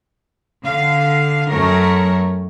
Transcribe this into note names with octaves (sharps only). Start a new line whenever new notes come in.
D3 F5
F#2 A3 A#4 C#5